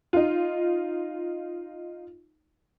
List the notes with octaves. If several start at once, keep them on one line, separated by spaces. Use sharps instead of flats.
D#4 F4